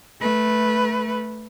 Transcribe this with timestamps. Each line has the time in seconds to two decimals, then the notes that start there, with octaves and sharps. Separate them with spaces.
0.20 A3 B4